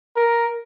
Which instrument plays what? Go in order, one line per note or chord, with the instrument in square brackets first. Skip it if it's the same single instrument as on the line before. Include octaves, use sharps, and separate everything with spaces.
[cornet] A#4